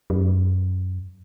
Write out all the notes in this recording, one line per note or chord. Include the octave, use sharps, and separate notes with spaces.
F#2